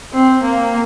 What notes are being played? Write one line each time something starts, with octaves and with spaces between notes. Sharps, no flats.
C4
A#3